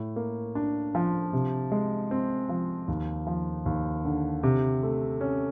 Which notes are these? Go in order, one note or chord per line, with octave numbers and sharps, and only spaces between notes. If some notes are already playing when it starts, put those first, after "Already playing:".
Already playing: A2
A#3
D4
F3
C3
G#3
C4
F3
D#2
F3
D#2
D3
C3
A3
C#4